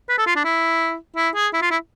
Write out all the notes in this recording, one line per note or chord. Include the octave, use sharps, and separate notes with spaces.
B4
A4
F4
D4
E4
E4
G#4
E4
F4
E4